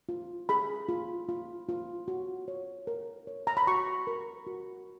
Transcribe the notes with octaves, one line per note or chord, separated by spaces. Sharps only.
F4
G#4 B5
F4
F4
F4
F#4
C#5
A#4
C#5
A#5
B5
F#4 C#6
A#4
F#4